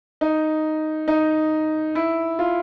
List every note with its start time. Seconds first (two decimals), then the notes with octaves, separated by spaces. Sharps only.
0.21 D#4
1.08 D#4
1.95 E4
2.39 F4